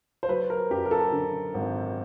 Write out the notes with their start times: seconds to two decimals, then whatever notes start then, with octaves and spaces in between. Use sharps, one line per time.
0.23 C5
0.28 F#3 B4
0.50 A#4
0.70 F#2 G4
0.86 A#4
0.91 A4
1.12 D3
1.54 G#1